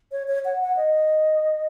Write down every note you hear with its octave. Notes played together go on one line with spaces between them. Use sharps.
C#5
C#5
F#5
F#5
D#5